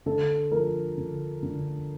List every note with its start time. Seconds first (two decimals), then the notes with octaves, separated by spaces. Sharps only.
0.06 D3 A4
0.52 F3 A#4
0.98 D3
1.43 D3